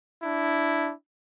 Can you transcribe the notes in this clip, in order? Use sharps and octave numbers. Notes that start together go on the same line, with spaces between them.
D4 E4